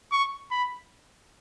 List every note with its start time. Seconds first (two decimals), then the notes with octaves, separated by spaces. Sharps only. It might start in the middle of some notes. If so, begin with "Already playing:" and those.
0.12 C#6
0.51 B5